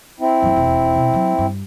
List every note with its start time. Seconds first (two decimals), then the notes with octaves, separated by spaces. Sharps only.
0.20 C4 E4
0.42 F#2 D3
0.56 E1 D#2
0.96 B2
1.10 F3 F#3
1.38 G2